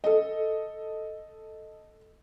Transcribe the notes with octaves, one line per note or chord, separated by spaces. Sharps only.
A4 D#5